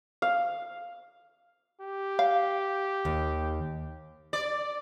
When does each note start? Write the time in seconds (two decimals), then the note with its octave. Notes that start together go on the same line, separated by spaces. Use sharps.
0.22 F5
1.81 G4
2.19 F5
3.05 D#2
4.33 D5